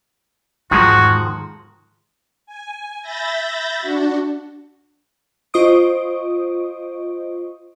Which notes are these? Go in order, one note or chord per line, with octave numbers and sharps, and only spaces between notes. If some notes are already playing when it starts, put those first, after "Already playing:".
E2 G#2 D#3 F3 G#3 F#4
G#5
E5 B5 G6 A6 A#6
D4 F#4
F4 C5 D#5 C#6 D#6 D7